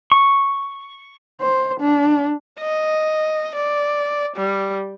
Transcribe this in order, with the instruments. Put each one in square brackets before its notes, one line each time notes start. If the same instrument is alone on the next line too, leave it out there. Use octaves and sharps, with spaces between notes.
[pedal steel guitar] C#6
[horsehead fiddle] C5
D4
[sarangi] D#5
D5
G3